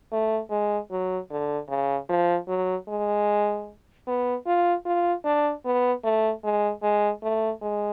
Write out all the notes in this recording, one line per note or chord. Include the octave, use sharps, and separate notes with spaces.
A3
G#3
F#3
D3
C#3
F3
F#3
G#3
B3
F4
F4
D4
B3
A3
G#3
G#3
A3
G#3